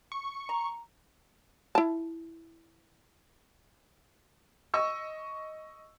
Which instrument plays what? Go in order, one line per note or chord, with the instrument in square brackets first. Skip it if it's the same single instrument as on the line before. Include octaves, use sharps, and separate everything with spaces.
[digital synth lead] C#6
[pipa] A#5
[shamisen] E4 A5
[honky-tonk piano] D#5 C#6 E6